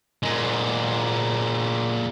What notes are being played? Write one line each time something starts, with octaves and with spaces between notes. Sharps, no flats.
A#2 G#3